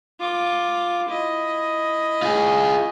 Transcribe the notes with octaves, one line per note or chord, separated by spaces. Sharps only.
F4 D6
E4 D#5
F4 G#4